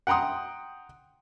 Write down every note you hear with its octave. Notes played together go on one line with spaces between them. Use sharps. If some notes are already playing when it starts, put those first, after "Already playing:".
F#5 G5 A#5 C6 D#6